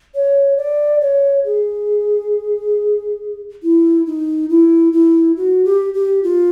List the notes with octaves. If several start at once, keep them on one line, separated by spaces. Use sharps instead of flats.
C#5
D5
C#5
G#4
E4
D#4
E4
E4
F#4
G4
G4
F4